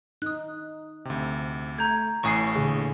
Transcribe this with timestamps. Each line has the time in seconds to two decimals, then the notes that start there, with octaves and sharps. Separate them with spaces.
0.22 D#4 D#6 F#6
1.05 D2 C3
1.78 A3 A#5 G6 G#6
2.23 A1 A2 G#5 C#6 D#6 C7
2.56 A#2 D3 G#4